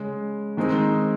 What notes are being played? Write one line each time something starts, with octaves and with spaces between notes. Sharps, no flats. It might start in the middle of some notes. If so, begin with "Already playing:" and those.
Already playing: C#3 G#3 C#4
D#3 G#3 C4 D#4